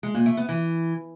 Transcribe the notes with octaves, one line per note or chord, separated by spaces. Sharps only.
G#3
A#2
A3
B3
E3